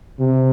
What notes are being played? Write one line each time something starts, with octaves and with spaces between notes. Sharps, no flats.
C3